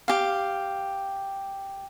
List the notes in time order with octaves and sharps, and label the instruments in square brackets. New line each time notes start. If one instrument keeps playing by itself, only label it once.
[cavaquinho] G4 F5